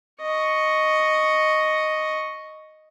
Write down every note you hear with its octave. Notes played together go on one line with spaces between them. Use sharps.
D#5 C#6